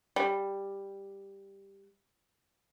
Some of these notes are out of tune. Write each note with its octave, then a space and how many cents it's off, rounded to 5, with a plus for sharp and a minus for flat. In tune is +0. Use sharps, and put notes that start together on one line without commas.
G3 +5